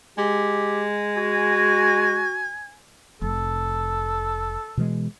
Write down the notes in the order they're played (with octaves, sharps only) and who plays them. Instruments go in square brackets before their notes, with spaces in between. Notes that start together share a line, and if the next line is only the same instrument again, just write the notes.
[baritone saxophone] G#3 [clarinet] G4
[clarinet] F#4 [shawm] G#5
[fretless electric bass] F1 [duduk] A4
[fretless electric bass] B2 E3 G#3